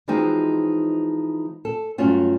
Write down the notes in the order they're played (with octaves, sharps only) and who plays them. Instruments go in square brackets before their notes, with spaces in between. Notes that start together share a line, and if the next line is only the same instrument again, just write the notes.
[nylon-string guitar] E3 F3 G#3 C4 D#4 F#4
A4
G2 F#3 A3 C#4 F4 F#4